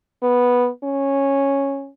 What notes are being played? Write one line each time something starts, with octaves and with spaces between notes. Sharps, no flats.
B3
C#4